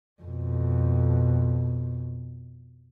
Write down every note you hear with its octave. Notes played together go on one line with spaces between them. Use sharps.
F2 B2